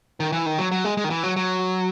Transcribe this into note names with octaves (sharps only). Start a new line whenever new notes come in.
D#3
E3
D#3
F#3
F#3
G#3
G#3
D#3
E3
F#3
F#3